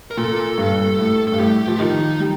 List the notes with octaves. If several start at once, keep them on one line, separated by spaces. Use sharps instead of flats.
A#4
A#2 A4
G2
A2
G2 A4
A2 G4
F3
D#3 D#4
G3